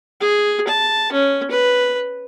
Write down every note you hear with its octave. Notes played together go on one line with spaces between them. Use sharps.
G#4
A5
C#4
B4